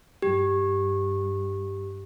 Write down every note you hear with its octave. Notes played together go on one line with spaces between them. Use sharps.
G2 G4